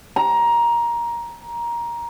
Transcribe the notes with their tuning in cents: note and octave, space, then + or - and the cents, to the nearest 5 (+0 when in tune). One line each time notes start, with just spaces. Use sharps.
A#5 +15